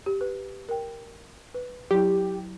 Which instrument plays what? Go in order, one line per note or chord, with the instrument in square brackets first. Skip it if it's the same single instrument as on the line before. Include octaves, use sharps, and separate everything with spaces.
[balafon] G4
B4
A#4 G5
B4
[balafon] F#3 E4 [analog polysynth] G4